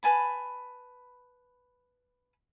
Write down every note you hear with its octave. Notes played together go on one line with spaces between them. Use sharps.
B4 G#5 A5 B5